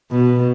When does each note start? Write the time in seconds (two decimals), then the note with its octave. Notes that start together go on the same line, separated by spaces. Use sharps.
0.11 B2